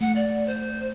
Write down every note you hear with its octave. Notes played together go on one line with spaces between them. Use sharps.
A3 F#5
D5
C5